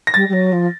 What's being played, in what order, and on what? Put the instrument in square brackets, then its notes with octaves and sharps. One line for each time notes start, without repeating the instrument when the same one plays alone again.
[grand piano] A#6
[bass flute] G3 [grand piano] A6
[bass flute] G3
F#3
F3